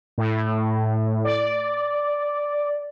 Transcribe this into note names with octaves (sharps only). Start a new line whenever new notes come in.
A2
D5